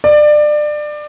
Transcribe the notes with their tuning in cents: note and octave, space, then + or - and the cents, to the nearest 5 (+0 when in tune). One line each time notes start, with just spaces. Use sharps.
D5 +25